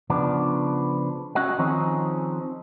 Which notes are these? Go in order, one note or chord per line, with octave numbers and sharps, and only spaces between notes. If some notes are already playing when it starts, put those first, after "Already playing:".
C#3 F3 B3 D4
C#4 F#4 D#5 E5 F#5
D#3 F3 C4 C#4 D#4 G#4